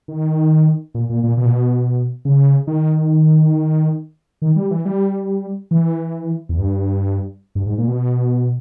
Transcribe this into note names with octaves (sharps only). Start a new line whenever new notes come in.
D#3
A#2
A#2
A#2
B2
A#2
B2
C#3
D#3
D#3
G3
E3
G3
E3
E2
G2
G2
G#2
A#2
B2